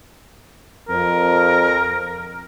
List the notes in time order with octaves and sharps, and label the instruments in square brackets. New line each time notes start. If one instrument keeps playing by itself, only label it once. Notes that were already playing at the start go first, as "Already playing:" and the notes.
[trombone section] F2 [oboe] A#4